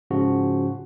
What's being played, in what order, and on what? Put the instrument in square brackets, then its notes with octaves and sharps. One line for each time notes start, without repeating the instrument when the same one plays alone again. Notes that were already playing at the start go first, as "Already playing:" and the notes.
[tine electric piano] G#2 C#3 F3 F#4